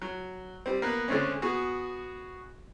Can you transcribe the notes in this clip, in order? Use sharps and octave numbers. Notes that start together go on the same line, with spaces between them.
F#3
G3 C4
A#3 B3 F#6
D3 G#3 A3 C4 C#4
B3 F#4 G#4